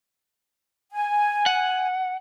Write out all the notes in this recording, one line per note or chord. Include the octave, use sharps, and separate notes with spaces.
G#5
F#5